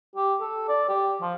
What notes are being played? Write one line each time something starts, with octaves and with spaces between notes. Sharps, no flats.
G4
A4
D5
G4
F3